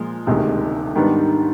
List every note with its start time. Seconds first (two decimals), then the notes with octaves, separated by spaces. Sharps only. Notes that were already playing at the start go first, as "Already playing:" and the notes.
Already playing: A#2 F3 G#3
0.27 E1 D2 C3 D#3 G#3
0.95 G#2 D#3 G3 B3 D4